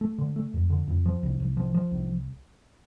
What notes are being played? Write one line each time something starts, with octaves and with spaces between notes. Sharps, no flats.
A3
D3
A3
F2
D3
F2
F3
C2
C2
F3
F3
C2